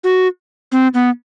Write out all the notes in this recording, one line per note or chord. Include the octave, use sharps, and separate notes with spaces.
F#4
C4
B3